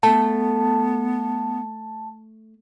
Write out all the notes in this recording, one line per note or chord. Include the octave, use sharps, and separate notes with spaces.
A3 B3 A5